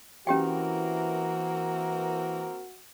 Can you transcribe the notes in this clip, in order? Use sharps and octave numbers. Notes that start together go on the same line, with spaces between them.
E3 A#3 C4 C#4 F#4 G4 A#4 G5